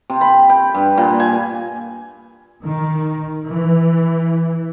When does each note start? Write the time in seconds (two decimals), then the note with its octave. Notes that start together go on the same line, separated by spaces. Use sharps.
0.10 C3
0.21 B5
0.49 G5
0.75 G2
0.98 A#2
1.20 G#5
2.65 D#3
3.49 E3